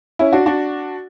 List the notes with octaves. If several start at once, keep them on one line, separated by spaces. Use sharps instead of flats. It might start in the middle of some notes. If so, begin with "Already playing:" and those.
C#4 E4
D4 F#4
D4 F#4